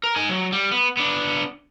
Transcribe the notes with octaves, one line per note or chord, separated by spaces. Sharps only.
A#4
D#4 G#5
F#3
G3
B3
B3 D4